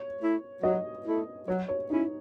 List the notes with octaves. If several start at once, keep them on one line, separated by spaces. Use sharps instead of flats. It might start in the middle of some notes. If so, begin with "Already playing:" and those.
Already playing: C#5
A3 E4
F#3 D#5
A3 E4
F#3 C#5
C#5
C#4 D#4 E4